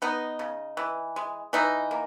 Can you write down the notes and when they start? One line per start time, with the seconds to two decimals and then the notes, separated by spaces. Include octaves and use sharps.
0.02 B3 D#4
0.39 C#3
0.77 E3
1.16 G#3
1.53 E3 D#4
1.91 A#3